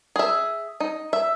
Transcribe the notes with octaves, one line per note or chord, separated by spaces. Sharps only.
G#4 E5
D#4
E5